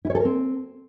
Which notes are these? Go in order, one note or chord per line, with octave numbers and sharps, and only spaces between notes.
E4
C#5
A4
A#4
C4